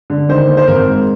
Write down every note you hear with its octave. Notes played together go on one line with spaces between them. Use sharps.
D3
D#3 C5
A#3
C5
G#1 A#4
G#2